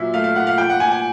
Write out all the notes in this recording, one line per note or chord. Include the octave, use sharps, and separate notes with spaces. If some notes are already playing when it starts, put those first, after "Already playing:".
Already playing: A#2 F#3 E5
A3 F5
F5
A#2 F#5
F5
F3 G5
F#5
A#2 G#5
G#5